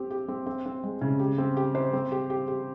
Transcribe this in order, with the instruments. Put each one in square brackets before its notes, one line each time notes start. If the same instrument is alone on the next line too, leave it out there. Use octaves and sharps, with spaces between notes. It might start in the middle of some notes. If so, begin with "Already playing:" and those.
Already playing: [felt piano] C4 G4
G4
C4
C4
C4
G#3
C#3
G4
C4
G4
C5
C4
G4
G4
G4